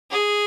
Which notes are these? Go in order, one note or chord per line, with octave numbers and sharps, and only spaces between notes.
G#4